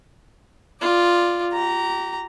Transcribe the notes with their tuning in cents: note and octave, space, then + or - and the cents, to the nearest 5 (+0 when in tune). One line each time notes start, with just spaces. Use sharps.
F4 +0 D5 +10
G4 -35 A#5 -5